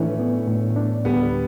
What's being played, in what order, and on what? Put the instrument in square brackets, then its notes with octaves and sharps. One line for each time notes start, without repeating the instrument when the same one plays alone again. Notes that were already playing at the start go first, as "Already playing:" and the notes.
Already playing: [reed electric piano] A2 E3 D4 [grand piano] A3 C#4
[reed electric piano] B3
A2
D4
[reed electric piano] D2 [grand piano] G3 B3